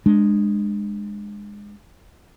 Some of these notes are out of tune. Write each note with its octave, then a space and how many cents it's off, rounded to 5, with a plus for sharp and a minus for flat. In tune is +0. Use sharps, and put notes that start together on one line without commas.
G#3 -10 D4 +25